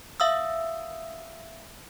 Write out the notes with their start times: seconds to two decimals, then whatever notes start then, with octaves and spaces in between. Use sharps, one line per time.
0.20 E5 F5 D#6 E6